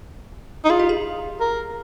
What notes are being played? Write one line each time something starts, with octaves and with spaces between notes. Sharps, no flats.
D#4
F4 G#4
G4
G#4
A#4